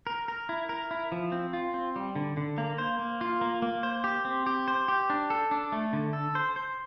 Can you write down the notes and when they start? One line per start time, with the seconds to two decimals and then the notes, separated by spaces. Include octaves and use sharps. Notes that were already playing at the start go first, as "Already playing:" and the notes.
0.07 A#4
0.28 A#4
0.49 E4
0.69 A#4
0.91 E4
1.12 F3
1.32 C4
1.53 F4
1.74 C4
1.96 G3
2.16 D3
2.37 D3
2.58 A#3
2.78 C5
2.99 A#3
3.21 F4
3.41 A#3
3.62 A#3
3.83 C5
4.04 G4
4.25 C4
4.46 G4
4.68 C5
4.88 G4
5.10 D4
5.30 A4
5.51 D4
5.72 A3
5.93 D3
6.13 A4
6.35 C5
6.56 C5